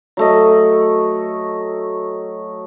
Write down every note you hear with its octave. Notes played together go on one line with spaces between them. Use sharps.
F#3 A3 D#5